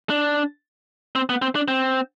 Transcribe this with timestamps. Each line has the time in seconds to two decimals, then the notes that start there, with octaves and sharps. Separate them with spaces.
0.10 D4
1.16 C4
1.29 B3
1.42 C4
1.55 D4
1.68 C4